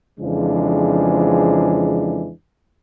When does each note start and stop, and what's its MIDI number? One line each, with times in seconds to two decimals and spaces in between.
0.20 2.31 41
0.20 2.31 49
0.20 2.31 52
0.20 2.31 53
0.20 2.31 56
0.20 2.31 62